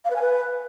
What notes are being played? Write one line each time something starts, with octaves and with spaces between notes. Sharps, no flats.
F5
B4
G#5
B4